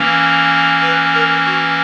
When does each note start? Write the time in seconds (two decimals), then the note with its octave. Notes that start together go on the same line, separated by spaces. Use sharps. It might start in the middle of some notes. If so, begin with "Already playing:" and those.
Already playing: E3 A#3 C#4
0.82 B4
1.13 A#4
1.45 F#4